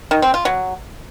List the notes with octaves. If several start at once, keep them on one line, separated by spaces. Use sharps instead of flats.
D#3
C4
F4
F#3